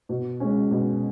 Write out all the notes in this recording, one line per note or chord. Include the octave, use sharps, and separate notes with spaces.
B2
G#3 C#4
B2